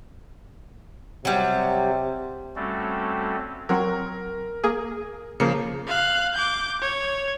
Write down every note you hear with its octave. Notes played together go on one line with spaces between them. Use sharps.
C3 F#3 G3
G3 A3 C4 C#4 F#4 A4
F#3 C4 F#4 A#4
A#3 G#4
C#3 F3 A#3 C#7
F5 F#6
D6 G6
C#5